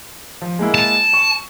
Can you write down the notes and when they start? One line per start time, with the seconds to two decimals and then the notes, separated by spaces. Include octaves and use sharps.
0.42 F3
0.59 G#3 A#3 E4
0.75 A5
1.13 C#6